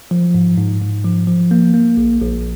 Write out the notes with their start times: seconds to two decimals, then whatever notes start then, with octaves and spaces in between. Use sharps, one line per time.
0.11 F3
0.34 G#2
0.57 G#2
0.82 G#2
1.04 F3
1.27 F3
1.51 A#3
1.74 A#3
1.97 A#1
2.20 A#1